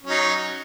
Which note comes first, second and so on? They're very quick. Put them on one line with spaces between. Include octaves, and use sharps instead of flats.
C#4 F#3 D#4